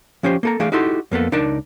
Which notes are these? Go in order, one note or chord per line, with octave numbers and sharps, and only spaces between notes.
F3 C#4 G4 C5
A#3 A4 A#5
E3 A3 G#4 D5 F5
D#4 E4 F#4 G4 A4 C6
F2 A#3 B3 A4
C#2 D4 D#4 A#4 D5 A5